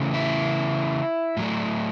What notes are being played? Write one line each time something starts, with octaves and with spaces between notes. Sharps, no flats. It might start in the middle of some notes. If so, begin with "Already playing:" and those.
Already playing: C#3 E3 A3
E4
A2 F#3 A3